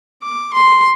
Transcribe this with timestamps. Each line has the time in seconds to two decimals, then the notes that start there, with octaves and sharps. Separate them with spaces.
0.23 D6
0.53 C6